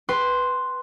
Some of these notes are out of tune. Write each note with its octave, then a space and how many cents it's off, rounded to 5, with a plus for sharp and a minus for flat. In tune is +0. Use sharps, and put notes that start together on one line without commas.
B4 +0 G5 -5 C6 +0